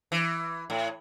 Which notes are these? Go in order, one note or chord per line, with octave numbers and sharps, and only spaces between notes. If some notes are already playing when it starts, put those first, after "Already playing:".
E3
A2